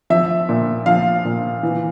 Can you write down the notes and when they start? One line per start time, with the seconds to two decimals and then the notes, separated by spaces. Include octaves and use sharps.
0.10 F3 E5
0.49 A#2
0.86 F3 F5
1.25 A#2
1.63 E3